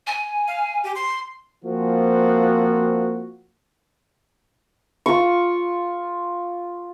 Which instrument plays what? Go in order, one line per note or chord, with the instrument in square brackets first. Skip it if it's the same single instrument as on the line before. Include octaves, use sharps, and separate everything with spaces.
[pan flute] G#5
[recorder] F5
G4
C6
[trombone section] F3 A#3 C4 F#4
[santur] F4 C#6